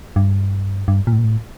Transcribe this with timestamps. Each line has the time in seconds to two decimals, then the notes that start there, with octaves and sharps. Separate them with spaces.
0.16 G2
0.88 G2
1.07 A#2
1.13 A2
1.19 A#2
1.24 A2